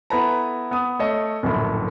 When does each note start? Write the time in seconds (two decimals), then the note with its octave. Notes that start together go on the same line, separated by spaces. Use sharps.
0.10 B3 E4 A4 B4 A5 A#5
0.71 B3 D#6
0.99 A3 C#5 D#5
1.43 D1 A#1 F#2 A4 B5